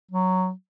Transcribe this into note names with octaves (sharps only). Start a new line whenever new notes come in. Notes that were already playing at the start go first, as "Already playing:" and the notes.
F#3